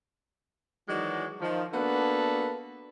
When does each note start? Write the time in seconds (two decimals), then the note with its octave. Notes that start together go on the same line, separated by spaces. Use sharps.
0.88 D#3 E3 F#3 G#3 F#4 D5
1.40 D#3 F3
1.73 A#3 B3 D4 F#4 A4 B4